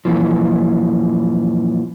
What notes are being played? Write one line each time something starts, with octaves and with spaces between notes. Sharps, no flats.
F#2 A#2 E3 F3